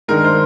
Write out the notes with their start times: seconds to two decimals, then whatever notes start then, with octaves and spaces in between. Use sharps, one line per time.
0.08 G2 D#3 G#3 A#4
0.24 C5